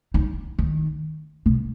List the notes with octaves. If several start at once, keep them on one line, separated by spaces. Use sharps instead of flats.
D#4
D#3
B2